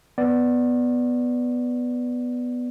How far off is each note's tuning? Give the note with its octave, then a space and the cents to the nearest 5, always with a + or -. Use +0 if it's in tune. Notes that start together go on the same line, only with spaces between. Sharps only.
B3 +0 D5 +0